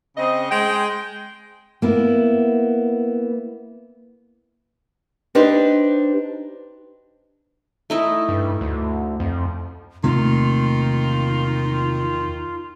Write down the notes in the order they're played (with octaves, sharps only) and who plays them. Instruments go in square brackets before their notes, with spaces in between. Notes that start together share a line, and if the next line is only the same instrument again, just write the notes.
[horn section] C#3 C4 D#5
G#3 G5
[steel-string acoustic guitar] A#3 B3 E4
[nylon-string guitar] D4 D#4 G4 B4 C5
[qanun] A3 D#4 E4
[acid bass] G2
D2
F2
[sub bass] E2 [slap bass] C3 A3 A#3 [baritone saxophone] D#3 [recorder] F4